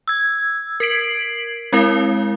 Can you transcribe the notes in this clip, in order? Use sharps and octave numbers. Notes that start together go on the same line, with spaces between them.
E6 G#6
A#4 G#6 B6 C7 D7 F#7
G#3 C4 E4 A#4 F5